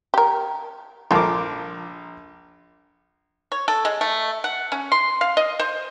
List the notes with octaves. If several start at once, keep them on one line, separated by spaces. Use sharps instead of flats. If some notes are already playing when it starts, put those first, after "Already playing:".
G4 A#4
A#1 F4 A4 A#4 D6
C#5
A4
G#3
A3
F#5
C#4
C6
F5
D#5
C5